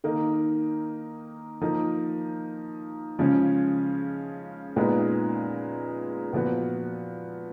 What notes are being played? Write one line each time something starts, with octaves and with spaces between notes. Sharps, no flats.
D#3 A#3 D#4
F3 A#3 D#4
C#3 F3 G#3 C#4
A#2 G#3 B3 D#4
A#2 F3 B3 F#4